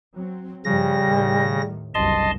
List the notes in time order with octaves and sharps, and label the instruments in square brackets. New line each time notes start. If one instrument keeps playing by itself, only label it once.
[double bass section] F#3 C4
[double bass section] G2 F3 [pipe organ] C#3 A#6 [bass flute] G3
[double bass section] D#2 A2 D#3
[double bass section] F#1 C2 G2 [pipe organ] D#5 A5 C6